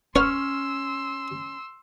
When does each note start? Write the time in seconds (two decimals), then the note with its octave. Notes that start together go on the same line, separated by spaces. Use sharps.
0.16 C#4 B4 C#5 F#5 C6 C#6 E6 F6